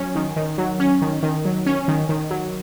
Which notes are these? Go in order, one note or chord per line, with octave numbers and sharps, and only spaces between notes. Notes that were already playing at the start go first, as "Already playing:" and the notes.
Already playing: F#3 C#4
D#3
D#3
F#3
C#4
D#3
D#3
F#3
C#4
D#3
D#3
F#3